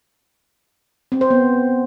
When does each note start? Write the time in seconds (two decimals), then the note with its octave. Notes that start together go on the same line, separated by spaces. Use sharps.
1.12 C4
1.21 C5
1.30 B3